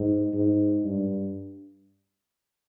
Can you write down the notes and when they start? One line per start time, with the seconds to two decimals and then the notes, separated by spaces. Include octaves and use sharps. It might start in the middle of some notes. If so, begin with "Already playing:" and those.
Already playing: G#2
0.34 G#2
0.84 G2